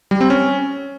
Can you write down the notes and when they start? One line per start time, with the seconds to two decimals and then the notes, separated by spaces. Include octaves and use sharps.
0.11 G3
0.21 C4
0.30 C#4